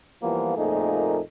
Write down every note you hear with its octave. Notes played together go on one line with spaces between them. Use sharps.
E3 F3 G3 A#3 B3 F4
F2 A#2 A3 A#3 D#4 G#4